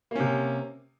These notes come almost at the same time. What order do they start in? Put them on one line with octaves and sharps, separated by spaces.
A#3 C#4 C3